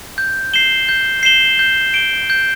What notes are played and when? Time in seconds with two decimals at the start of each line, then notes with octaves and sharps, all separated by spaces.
0.18 G6
0.54 C7 E7 G7
0.89 G6
1.23 C7 E7 G7
1.59 G6
1.94 D7 G7
2.30 G6